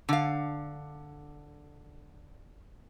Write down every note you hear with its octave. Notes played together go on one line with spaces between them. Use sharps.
D3 F5